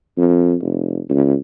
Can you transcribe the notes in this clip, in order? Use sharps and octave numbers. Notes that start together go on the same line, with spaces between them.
F2
F1
C#2